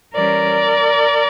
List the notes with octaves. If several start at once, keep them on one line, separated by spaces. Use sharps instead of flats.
E3 G3 C#4 A#4 D5